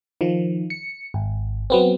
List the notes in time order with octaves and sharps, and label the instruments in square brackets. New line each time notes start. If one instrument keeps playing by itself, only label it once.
[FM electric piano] D#3 F3
C#7
G#1
F#3 B3 C4